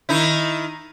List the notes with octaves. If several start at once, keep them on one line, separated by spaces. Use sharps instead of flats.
D#3 D#4 E4